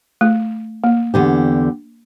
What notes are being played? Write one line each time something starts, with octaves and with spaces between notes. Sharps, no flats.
A3
A#3
E2 D3 G4